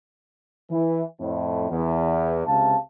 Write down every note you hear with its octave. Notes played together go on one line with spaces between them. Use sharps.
E3
F2 A2
E2
C#2 C3 F5 A5